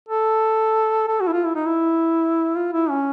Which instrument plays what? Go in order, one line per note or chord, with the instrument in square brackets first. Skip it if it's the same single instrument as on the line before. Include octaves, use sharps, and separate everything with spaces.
[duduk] A4
A4
F#4
E4
F4
E4
D#4
E4
F4
E4
C#4